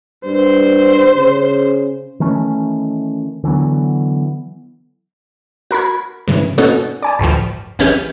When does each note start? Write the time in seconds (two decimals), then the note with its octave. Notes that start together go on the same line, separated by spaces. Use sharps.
0.25 G2 C5
1.16 C#3
2.20 D#3 E3 A3 C#4
3.44 D3 E3 F#3 B3
5.71 F#4 A#4 B5 G#6
6.28 G2 C#3 E3
6.58 B2 A#3 C#4 D#4 F#4 A4
7.02 D5 G#5 A5
7.19 G1 D2 A2 F3
7.79 G1 E3 C#4 G4 G#4